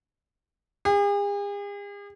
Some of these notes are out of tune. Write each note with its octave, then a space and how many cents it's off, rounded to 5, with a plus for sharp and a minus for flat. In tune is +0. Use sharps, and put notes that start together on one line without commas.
G#4 -45